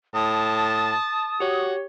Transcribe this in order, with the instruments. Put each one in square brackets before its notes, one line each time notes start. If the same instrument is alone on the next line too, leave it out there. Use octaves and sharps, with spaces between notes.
[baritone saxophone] A2 [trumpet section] A5 [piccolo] D#6
[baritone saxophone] F#4 [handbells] G4 C#5